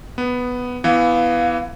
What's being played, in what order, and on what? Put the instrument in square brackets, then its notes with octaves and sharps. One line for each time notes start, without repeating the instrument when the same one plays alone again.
[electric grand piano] B3
[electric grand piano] E3 B3 [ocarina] F5